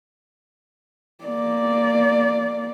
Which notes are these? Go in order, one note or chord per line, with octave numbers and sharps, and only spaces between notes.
A#3 D5